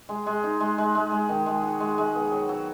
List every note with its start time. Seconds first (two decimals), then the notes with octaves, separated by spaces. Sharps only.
0.09 G#3
0.26 G#3
0.44 D#4
0.60 G#3
0.78 G#3
0.95 G#3
1.12 G#3
1.29 D#3
1.46 G#3
1.63 F#4
1.80 G#3
1.98 G#3
2.15 B3
2.32 F#3
2.49 F#3